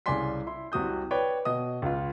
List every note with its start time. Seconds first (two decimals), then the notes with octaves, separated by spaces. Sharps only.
0.06 C2 C#3 D5 G#5 C6 B6
0.47 E4 C6
0.72 C2 C3 F#4 D#6 G6
1.11 B4 C#5 D5 G5
1.45 B2 D#5 D#6
1.82 C#2 F4